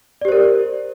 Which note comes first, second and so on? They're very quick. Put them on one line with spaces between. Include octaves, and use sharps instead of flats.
D5 G4 C5 A#4